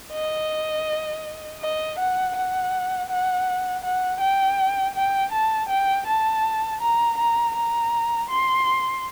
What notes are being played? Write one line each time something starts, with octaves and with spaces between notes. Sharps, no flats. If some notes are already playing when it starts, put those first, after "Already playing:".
D#5
D#5
F#5
F#5
F#5
F#5
G5
G5
A5
G5
A5
A#5
A#5
A#5
C6